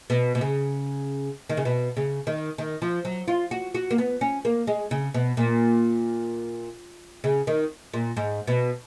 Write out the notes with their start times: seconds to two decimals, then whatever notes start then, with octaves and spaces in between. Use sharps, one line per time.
0.10 B2
0.35 B2
0.41 C#3
1.49 D#3
1.57 C#3
1.65 B2
1.97 C#3
2.27 D#3
2.58 D#3
2.82 F3
3.05 F#3
3.28 F4
3.51 F#4
3.75 F#4
3.91 A#3
3.98 B3
4.21 C#4
4.45 A#3
4.67 G#3
4.91 C#3
5.14 B2
5.37 A#2
7.24 C#3
7.47 D#3
7.94 A#2
8.17 G#2
8.47 B2